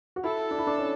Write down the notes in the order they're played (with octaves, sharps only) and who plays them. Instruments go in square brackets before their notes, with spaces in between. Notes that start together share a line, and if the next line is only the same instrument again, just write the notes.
[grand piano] F#4
[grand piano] E4 [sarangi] A4
[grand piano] D4
E4
D4
C#4